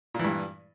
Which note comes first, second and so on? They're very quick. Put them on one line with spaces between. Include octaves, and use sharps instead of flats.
A#2 E3 G2